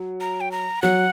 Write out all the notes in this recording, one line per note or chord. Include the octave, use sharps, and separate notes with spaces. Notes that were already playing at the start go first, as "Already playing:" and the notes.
Already playing: F#3
A#5
G5
A#5
F#3 F#5